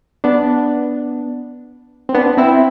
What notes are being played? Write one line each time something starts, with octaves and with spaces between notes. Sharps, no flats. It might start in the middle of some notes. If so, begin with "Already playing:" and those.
B3 D4
C4
B3 D4
C4 E4